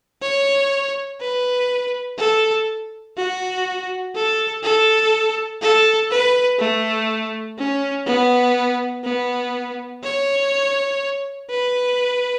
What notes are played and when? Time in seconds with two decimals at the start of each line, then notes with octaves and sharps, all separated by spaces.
0.22 C#5
1.20 B4
2.19 A4
3.17 F#4
4.15 A4
4.63 A4
5.62 A4
6.11 B4
6.59 A3
7.58 C#4
8.07 B3
9.04 B3
10.04 C#5
11.50 B4